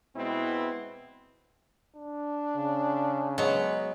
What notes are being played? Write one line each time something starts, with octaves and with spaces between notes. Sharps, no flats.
B2 G#3 B3 C4 E4
D4
C#3
F#3 G#3 B3